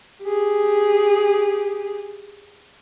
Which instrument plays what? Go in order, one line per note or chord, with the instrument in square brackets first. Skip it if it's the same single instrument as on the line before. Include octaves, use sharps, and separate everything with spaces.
[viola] G4 G#4